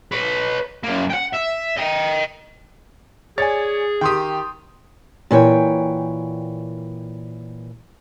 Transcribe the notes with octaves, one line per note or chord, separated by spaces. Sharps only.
B4 C#5
F#2 A#3
F#5 G5
E5
D#5 G5
G#4 C#5 D5 G#5 A6 C#7
D#3 G4 G5 C6 D#6
A#2 E3 C#5 G5